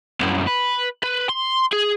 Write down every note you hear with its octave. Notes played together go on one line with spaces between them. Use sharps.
C2 F#2
B4
B4
C6
G#4